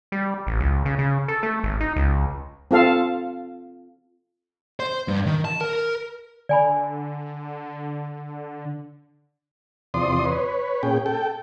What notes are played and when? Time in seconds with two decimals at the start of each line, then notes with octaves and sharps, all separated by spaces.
0.12 G3
0.47 A1
0.60 C#2
0.85 C#3
0.99 C#3
1.28 A4
1.43 A3
1.63 G#1
1.80 D#4
1.96 C#2
2.71 C4 F4 A4 F5 A5
4.80 C5
5.08 G2
5.26 D#3
5.45 A5
5.61 A#4
6.49 D3 D5 G#5 B5
9.94 E2 C3 F3 D5 C6 D#6
10.25 B4 C#5
10.83 A#2 C#4 G#4 G5
11.06 A4 G5